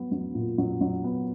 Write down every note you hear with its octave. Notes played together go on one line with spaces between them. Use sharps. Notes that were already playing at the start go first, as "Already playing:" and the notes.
Already playing: F#3 B3
F#3
A#2
F#3
F#3
B3